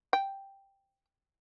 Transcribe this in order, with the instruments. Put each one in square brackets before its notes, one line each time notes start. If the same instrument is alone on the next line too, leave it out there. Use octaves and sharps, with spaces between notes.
[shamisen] G5